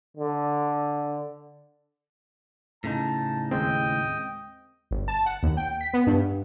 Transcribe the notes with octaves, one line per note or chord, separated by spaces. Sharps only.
D3
A2 C#3 D#4 A5
D#2 G#3 C4 D#5 G5
G1
A5
F#5
D#2
G5
B6
B3
G2